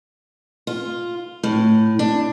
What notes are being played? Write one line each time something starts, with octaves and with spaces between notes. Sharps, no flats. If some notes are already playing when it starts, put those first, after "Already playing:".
F4
A2
D4